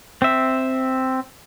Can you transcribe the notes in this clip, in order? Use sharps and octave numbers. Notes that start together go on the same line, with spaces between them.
C4 E5